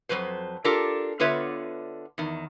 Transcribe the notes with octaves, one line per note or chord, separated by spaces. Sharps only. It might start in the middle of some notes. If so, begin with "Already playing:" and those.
F2 G#2 F#3 B4 C5
D4 F4 G4 A4 A#4
D3 B3 F4 B4 C#5 E5
E2 D#3